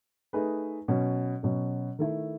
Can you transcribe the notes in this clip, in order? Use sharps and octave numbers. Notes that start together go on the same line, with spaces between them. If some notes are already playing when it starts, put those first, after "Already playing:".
A3 D#4 G#4 B4
B2 F#3 C#4
B2 F#3 C#4
D#3 A3 E4 A4